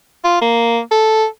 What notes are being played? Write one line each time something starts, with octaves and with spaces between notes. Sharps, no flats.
F4
A#3
A4